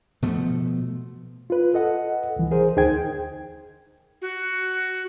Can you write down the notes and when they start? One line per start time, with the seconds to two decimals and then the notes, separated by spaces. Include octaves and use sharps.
0.22 B2 F3 A3
1.50 F4 B4
1.74 A4 D#5 F#5
2.36 C2 E3
2.51 G#4 A#4 C5
2.77 D2 D#4 G#4 C5 G5 G#6
4.22 F#4